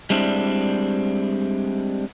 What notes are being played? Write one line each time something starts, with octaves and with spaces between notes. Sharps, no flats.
G3 G#3 C4 D4 E4